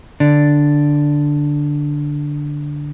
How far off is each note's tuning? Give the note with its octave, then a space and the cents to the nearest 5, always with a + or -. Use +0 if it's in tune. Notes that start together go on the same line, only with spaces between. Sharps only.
D3 +0 D5 +0